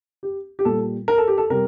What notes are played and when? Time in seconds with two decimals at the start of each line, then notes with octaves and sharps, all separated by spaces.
0.23 G4
0.59 G4
0.65 A#2 G3 A4
1.08 A#4
1.18 A4
1.28 G4
1.38 A4
1.50 C3 G3 A#4